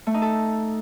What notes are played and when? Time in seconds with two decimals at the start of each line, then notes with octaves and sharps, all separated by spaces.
0.07 A3
0.14 D#4
0.22 A4